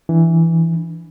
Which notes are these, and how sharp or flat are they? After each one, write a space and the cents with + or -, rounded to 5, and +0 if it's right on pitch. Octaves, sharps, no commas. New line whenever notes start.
E3 +0 D4 +0